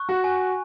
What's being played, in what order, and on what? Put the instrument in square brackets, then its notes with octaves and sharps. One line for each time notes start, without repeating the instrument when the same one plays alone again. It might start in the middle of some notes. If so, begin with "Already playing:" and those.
Already playing: [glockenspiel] C#6 F#6
[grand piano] F#4
[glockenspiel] G#5